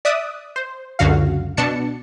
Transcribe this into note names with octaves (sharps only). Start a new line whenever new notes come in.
D5 E5 D#6 F#6
C5
C#2 F#2 D3 F#4 F5
B2 D4 A5 C#7